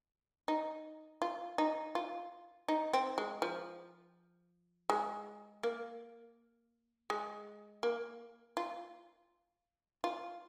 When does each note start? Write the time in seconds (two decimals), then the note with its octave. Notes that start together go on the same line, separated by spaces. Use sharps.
0.48 D#4
1.22 F4
1.58 D#4
1.95 F4
2.68 D#4
2.93 C4
3.18 G#3
3.42 F3
4.90 G#3
5.63 A#3
7.10 G#3
7.83 A#3
8.57 F4
10.04 F4